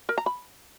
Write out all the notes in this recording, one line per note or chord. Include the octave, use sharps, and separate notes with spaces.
A#4
A#5
B5